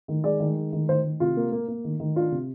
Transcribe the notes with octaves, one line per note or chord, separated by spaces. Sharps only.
D#3
G#3 D5
D#3
G#3
D#3
D#3 C5
D#3
C3 F4
A#3
A#3
A#3
D#3
D#3
D4 F4
C3